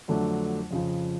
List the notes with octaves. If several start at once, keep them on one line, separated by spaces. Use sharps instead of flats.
F2 D3 F#3 A3 D4
F2 C#3 F3